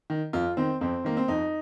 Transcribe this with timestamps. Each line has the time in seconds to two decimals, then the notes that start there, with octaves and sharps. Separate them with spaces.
0.10 D#3
0.33 F2 F4
0.57 D#3 C4
0.81 F2 C4
1.04 D#3 A#3
1.17 C4
1.28 F2 D#4